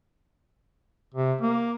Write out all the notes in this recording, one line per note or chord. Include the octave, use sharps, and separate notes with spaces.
C3
A#3